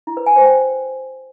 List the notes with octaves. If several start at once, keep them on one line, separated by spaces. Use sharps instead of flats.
E4
B4
G#5
C5
G5